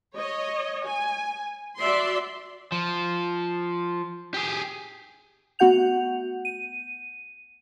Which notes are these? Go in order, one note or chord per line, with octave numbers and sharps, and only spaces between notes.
C#5 D#5
G#5
F#4 D5 E5 C6
F3
G4 G#4
A3 B3 F#4 F#5 G6 F7
D#7